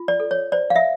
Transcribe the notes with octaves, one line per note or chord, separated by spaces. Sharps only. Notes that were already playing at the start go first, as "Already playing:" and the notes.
Already playing: F4
D5
A4
C#5
C5 D5
F5
E5